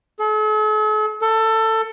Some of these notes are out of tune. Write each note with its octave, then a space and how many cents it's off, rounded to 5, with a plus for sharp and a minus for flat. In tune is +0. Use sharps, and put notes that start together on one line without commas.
A4 -45
A4 +20